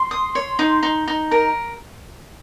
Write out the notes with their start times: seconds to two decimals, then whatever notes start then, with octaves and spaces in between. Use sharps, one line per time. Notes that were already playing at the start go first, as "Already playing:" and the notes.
Already playing: C6
0.11 D#6
0.35 C#5
0.59 D#4
0.83 D#4
1.08 D#4
1.31 A#4 A#5